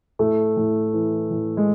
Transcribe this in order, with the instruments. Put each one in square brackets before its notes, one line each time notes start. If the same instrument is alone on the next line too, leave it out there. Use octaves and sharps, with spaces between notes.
[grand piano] A2 A3
A2
E3
A2
G#3